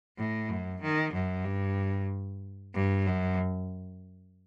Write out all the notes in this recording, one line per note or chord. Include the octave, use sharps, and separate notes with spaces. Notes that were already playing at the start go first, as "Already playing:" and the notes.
A2
F#2
D#3
F#2
G2
G2
F#2